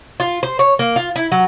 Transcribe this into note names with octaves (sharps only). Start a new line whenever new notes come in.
F4
C5
C#5
A#3
F4
E4
F#3